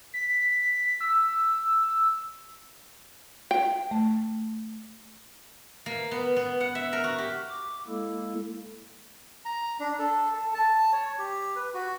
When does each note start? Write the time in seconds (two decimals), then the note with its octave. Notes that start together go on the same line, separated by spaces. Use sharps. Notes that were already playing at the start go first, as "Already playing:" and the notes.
0.14 B6
1.01 E6
3.51 G5
3.91 A3
5.86 A#3
6.11 B3
6.36 B3
6.61 F#5
6.75 E5
6.93 A#4
7.04 F#4
7.18 G4
7.50 D6
7.88 G#3 A#3 E4 A4
9.45 A#5
9.80 D4
9.99 A4
10.33 A4
10.54 A5
10.93 C#5
11.19 G4
11.56 B4
11.74 F#4